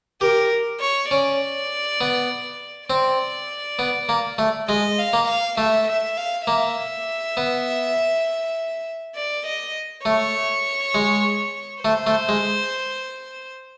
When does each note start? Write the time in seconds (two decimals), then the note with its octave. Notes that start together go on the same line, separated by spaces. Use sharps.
0.21 G4 A#4
0.80 C#5
1.10 C#4 D5
2.01 B3
2.90 C4 D5
3.79 B3
4.09 A#3
4.38 A3
4.69 G#3 D#5
4.99 F5
5.13 A#3
5.28 F5
5.58 A3 E5
5.88 E5
6.17 F5
6.47 A#3 E5
7.37 B3
9.16 D5
9.46 D#5
10.05 A3 C#5
10.94 G#3
11.84 A3 C5
12.07 A3
12.29 G#3